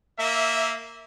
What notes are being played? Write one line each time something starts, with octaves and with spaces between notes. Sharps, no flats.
A#3 E5